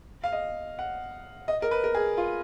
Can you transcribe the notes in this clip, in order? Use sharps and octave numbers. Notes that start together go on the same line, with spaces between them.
F5
D#5
F#5
D#5
A#4
B4
A#4
G#4
F4